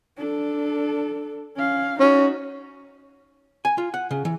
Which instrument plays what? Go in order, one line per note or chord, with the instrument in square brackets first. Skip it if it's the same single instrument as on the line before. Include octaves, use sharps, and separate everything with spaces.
[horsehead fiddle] D4 A4
C#4 F5
[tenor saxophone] C#4 [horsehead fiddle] D#4 F#4
[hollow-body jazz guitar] G#5
F4
F#5
C#3
E3